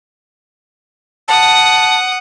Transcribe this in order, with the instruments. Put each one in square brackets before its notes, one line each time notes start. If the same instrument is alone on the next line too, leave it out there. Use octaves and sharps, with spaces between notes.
[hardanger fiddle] F#5 D#6 [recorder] A5